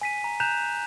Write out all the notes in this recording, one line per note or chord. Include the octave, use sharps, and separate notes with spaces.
G#5 B6 D#7
A#5
A#5 F#6 G6 E7 F7